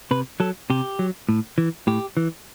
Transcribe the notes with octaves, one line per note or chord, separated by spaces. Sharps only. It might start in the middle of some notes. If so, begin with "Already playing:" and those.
C3 B4
F#3 A4
C3 G4
F#3
A2
E3
A2 G4
E3